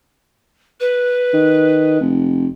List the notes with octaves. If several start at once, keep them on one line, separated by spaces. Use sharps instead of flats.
B4
D#3
F1